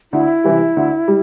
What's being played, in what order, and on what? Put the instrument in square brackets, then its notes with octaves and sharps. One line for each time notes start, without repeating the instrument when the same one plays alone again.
[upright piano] D2 [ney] E4
[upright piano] C3 E3 G3
D2
G3